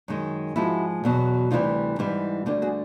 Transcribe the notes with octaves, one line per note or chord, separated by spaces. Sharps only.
F#2 D#3 G#3
G#2 F3 G#3 E4 F#4
E2 B2 F#3
D2 C3 E3 G3 D#4 F4
G#2 E3 G3
D2 D3 G3 F4 G4
F#4 G#4